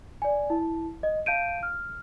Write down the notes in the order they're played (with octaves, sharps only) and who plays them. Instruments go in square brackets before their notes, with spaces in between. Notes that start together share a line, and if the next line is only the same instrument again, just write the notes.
[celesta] D5 G#5
E4 A5
D#5
F5 A5 G6 D7 D#7
F6